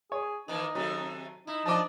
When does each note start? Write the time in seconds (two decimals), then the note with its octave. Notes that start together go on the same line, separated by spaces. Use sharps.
0.12 G#4 C#5
0.48 D#3 E3 A#3 D#4
0.75 C3 D#3 F#3 A3
1.47 D#4 E4
1.66 F3 D4 F4 D#5 A5 D6